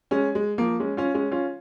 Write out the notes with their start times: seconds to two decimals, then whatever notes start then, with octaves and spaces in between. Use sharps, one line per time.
0.11 G#3 C#4
0.35 G#3
0.58 F3 A#3
0.80 G#3 C#4
0.97 C#4 F4
1.14 G#3 C#4
1.31 C#4 F4